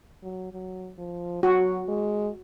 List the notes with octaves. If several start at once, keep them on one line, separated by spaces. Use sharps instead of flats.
F#3
F#3
F3
F#3 F#4
G#3